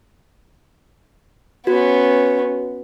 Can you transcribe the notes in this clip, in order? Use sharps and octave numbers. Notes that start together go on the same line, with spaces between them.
B3 C#4 F#4